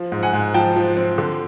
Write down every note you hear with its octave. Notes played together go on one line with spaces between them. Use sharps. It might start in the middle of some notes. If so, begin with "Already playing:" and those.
Already playing: F3
G#2
F#5 G#5
G#2
F3 G5 A5
F3
C4
D3